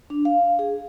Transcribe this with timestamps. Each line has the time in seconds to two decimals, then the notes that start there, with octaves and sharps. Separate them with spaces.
0.10 D4
0.25 F5
0.59 G#4